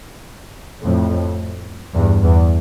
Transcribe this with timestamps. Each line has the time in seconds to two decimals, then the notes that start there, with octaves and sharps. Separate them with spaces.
0.82 F2 A2
1.94 E2 G2
2.23 E2